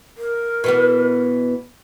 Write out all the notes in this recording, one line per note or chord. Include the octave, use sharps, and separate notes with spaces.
A#4
B2 E3 B3